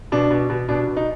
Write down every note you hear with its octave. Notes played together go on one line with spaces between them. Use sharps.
B2 D4
B2
B2
B2 D4
B2
D#4